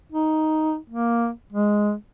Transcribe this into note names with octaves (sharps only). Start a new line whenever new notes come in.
D#4
A#3
G#3